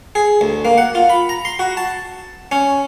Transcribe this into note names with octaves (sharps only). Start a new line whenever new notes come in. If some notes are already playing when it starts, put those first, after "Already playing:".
G#4
D2
A#3
F#5
F4
B5
A#5
C6
F#4
A5
C#4